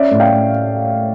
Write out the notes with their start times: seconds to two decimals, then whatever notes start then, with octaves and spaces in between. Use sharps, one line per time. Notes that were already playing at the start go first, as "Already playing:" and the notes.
Already playing: C#4 D5 E5
0.11 A2
0.20 F5 G5
0.30 A3